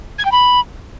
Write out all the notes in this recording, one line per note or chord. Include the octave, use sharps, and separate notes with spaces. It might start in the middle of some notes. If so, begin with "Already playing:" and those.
G#6
G5
B5